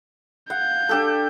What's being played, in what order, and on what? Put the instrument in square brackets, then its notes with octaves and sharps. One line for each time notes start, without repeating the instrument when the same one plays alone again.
[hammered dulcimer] F5 F#5 [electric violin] G6
[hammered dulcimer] D4 G4 A4